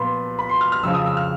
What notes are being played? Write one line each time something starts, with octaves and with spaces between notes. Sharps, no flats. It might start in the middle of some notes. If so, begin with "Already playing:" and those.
Already playing: A#2 F3 B3 B5 C6
B5
C6
F6
F6
F2 C#3 F3 E6
D#6
E6
F6